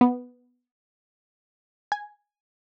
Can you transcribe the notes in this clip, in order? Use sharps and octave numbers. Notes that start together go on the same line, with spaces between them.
B3
G#5